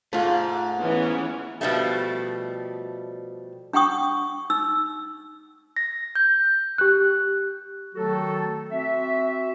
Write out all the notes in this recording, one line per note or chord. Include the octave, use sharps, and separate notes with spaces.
G#2 A3 F4
E3 B3 C#4
B2 F3 G3 A3
D4 F#5 G5 C#6 D#6
D#4 E6
A#6
G6
G4 F#6
D#3 F#3 A3 F#4 A4
C4 F#4 E5